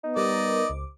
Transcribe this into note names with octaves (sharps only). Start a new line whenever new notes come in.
B3 D#4
G3 A#4 D5 D#5
C#2 D6